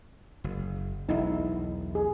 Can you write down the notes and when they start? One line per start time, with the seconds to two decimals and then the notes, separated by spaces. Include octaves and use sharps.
0.44 F#1
1.09 E1 B1 D#4 E4
1.95 G#4